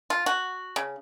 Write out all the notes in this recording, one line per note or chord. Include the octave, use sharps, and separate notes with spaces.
F4
F#4
C#3